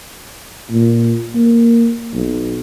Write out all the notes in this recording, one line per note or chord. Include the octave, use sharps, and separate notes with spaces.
A#2
A#3
B1